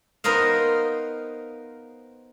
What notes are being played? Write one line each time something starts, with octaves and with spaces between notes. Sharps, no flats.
B3 D#4 A#4 C5 D#5 F5